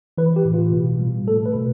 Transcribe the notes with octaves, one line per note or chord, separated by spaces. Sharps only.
E3 B4
G4
A2
F4
B2
G3
A3 A4
B4
B2